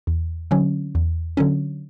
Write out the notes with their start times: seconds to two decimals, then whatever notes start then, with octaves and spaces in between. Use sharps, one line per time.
0.07 E2
0.51 D3 F#3 C#4
0.95 E2
1.37 D3 F#3 C#4